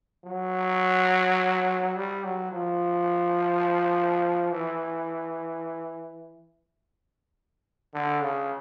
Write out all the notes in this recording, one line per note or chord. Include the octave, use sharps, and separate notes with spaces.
F#3
G3
F#3
F3
E3
D3
C#3